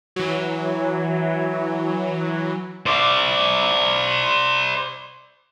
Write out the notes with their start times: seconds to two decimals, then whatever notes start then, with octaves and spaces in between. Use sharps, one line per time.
0.16 E3 F#3
2.86 C5 D5